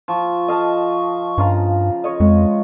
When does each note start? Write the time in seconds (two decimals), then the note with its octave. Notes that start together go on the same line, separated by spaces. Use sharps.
0.08 F3 C#6
0.48 D#5 F5 A5
1.38 G2 C#3 F4 A#5
2.04 C#5 D#5
2.20 F2 G#3